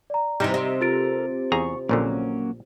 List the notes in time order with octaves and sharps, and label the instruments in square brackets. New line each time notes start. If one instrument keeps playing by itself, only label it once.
[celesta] D5 A#5
[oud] C3 E3 [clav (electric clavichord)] G3 D#4
[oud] C3 [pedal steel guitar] D#5 E5 C6
[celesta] F4 A6 D7 [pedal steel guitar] A4 A#4 A#5
[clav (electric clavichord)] E2 G#4 A#5 [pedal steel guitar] C#6
[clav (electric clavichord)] A#1 A#2 D3 [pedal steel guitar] F#3 A#3 C#4